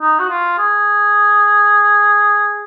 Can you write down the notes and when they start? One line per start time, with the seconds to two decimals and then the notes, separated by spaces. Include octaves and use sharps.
0.01 D#4
0.19 F#4
0.29 F4
0.58 G#4